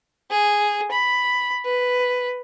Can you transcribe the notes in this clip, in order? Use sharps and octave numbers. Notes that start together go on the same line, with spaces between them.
G#4
B5
B4